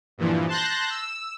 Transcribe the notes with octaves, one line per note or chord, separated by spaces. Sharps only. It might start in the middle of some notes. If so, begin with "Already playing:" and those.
G2 A#2 E3 F3
A5 C6 F#6 G6 A#6
E6